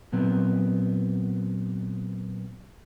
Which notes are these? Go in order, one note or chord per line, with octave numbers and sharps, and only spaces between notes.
A#2 F#3 B3 C4